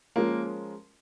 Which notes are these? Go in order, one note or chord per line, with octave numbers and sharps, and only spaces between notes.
F3 G#3 A#3 C#4 F4 A#4